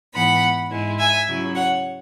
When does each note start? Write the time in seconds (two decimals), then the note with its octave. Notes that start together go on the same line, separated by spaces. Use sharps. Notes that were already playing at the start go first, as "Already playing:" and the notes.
0.14 G#2 E3 B3 F#5 B5
0.70 G#2 G#3 E4
0.98 E5 G#5
1.27 C#3 F#3 E4
1.54 C#5 F#5